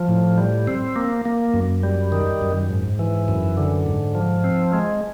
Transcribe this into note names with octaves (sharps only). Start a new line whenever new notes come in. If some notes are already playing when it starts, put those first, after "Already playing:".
Already playing: F3
A2
G3
C4
A#3
A#3
F#2
G3
D#3
F#2
G#2
E3
F#2
D3
G#2
F3
C4
G#3